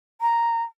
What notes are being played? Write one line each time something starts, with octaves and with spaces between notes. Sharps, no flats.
A#5